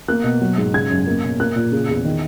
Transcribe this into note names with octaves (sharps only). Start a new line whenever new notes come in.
A#3 F#6
B2
F#3
G#2
C#3 G#6
F#2
A#3
B2
A#3 F#6
A#2
C#3
E2
D#3